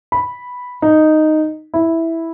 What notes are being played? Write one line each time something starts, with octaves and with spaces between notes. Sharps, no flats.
B5
D#4
E4